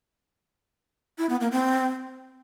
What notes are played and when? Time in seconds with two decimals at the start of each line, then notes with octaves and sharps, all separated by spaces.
1.18 E4
1.29 B3
1.41 A#3
1.52 C4